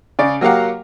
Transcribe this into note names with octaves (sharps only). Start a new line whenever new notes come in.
C#3 D5
F#3 A#3 G4 F5 F#5